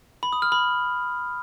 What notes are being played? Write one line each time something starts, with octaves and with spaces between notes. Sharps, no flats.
B5
D#6
F6
B5